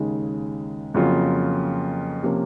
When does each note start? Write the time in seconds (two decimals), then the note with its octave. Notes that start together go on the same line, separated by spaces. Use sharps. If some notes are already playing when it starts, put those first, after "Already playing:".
Already playing: D#2 C#3 G#3 D#4 G#4
0.94 F2 C#3 F#3 A#3 F4
2.23 C3 F3 A#3 C#4